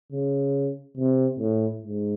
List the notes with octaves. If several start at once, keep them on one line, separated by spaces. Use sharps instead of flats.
C#3
C3
A2
G#2